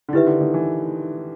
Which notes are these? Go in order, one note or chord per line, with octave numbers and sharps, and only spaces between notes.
D3
D#3 E4 G4 B4 E5
D3
D#3
E3